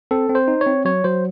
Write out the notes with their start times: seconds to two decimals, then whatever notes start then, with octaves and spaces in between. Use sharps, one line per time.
0.11 C4 A4
0.29 C4
0.35 C5
0.48 D#4
0.61 C#5
0.66 C4
0.85 F#3 C#5
1.04 F#3 C5